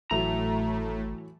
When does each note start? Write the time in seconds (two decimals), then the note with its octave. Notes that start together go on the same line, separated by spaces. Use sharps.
0.11 G#1 A2 E3 F#3 A3 A#5